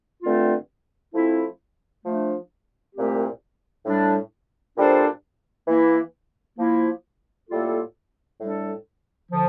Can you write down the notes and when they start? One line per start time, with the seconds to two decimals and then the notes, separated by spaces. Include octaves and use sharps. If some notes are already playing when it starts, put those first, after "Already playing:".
0.23 G2 D3 A3 C4 F4
1.14 F3 A3 C4 E4
2.05 F3 A3 D4
2.96 C2 A#2 A3 C4 G4
3.86 A2 G3 D4
4.76 A#2 G3 D4 A4 C5
5.67 E3 A#3 E4
6.58 F3 A#3 E4
7.49 A2 G3 A#3 F4 A4
8.40 A2 G3 D4 A4
9.31 D3 F3